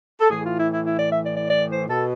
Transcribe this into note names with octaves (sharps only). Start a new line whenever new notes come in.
A4
A2 E3 G#4
F4
E4
E4
E4
D5
E5
D5
D5
D5
C5
B2 A4